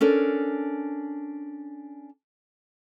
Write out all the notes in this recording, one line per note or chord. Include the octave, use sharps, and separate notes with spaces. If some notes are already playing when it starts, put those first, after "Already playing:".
C#4 D4 A4 A#4